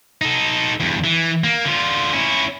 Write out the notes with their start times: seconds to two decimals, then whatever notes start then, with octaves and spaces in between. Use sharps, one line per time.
0.22 D#4 A4
0.80 E2 G2
1.04 E3
1.44 A#3
1.65 D3 F4
2.13 C#4 E4